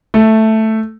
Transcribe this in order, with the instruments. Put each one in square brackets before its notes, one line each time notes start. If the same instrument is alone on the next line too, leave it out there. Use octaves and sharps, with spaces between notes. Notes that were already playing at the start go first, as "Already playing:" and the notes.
[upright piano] A3